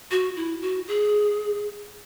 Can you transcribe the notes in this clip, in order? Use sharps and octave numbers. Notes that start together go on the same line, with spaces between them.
F#4
E4
F#4
G#4